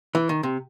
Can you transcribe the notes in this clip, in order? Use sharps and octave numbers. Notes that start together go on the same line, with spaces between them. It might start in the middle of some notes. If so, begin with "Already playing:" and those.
E3
D#3
C3